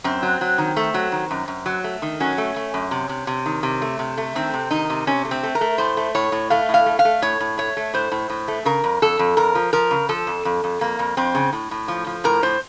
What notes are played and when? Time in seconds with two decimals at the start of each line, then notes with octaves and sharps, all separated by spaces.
0.04 F#2 C4
0.23 F#3
0.41 F#3
0.58 D#3
0.77 A3
0.94 F#3
1.12 D#3
1.31 F#2
1.48 F#2
1.66 F#3
1.84 A3
2.02 D#3
2.20 F#3 C#4
2.38 A3
2.56 A3
2.74 F#2
2.91 C3
3.09 C3
3.27 C3
3.46 D#3
3.63 C3
3.82 A3
3.99 C3
4.18 A3
4.35 D#3 C4
4.54 C3
4.71 D#3 D#4
4.90 C3
5.07 C3 C#4
5.25 A3
5.31 C4
5.43 A3
5.55 A#4
5.61 A3
5.78 A2 C5
5.97 A3
6.15 A2 C#5
6.32 A2
6.50 A3 F5
6.69 A2 F5
6.86 A3
6.99 F5
7.05 A3
7.22 A2 C#5
7.40 A2
7.58 A3 C#5
7.77 A3
7.94 A2 C5
8.12 A2
8.30 A2
8.48 A3
8.65 C#3 A#4
8.84 F2
9.02 F2 A4
9.19 F2
9.37 F2 A#4
9.55 F3
9.73 F3 A#4
9.91 C#3
10.09 F3 A4
10.27 F2
10.45 F2
10.64 F2
10.81 F2 A#3
10.99 F2
11.17 F2 C4
11.35 C#3
11.53 A2
11.71 A2
11.88 F3
12.07 F3
12.24 A2 A#4
12.43 A2 C5